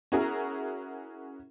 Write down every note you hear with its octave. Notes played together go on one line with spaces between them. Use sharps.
C#4 E4 F#4 G#4 A#4